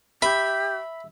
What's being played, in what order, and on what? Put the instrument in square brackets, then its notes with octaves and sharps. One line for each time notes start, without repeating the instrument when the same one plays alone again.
[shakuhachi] G4 [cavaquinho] E5 [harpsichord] B5